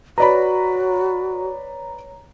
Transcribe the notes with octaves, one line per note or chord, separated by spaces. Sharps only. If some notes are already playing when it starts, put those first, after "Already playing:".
F#4 B4 C#5 D5 A#5 B5